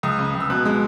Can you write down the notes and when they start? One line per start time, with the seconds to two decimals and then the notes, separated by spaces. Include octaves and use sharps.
0.03 C#2 D#6
0.19 C#3
0.35 C#2
0.40 E6
0.50 B2 F#6
0.65 G#3